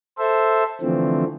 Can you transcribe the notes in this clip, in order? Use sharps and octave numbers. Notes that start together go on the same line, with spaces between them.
A4 C5 E5
D3 E3 F3 A3 C4